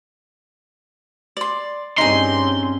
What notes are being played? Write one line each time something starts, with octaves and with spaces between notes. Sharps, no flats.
D5 C6
G2 C4 C#4 D#4 G#4 C6